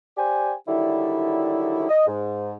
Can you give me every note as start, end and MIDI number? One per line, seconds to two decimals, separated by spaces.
0.17 0.54 67
0.17 0.54 72
0.17 0.54 74
0.17 0.54 79
0.17 0.54 80
0.68 1.87 50
0.68 1.87 51
0.68 1.87 54
0.68 1.87 55
0.68 1.87 64
1.89 2.04 75
2.07 2.55 44